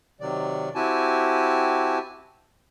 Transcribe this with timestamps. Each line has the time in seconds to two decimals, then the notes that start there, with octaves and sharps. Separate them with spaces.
0.20 C3 D#3 F#3 D5
0.75 C4 E4 F#4 G4 G#5 A5